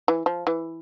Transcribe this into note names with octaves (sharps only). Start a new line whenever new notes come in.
E3
F3
E3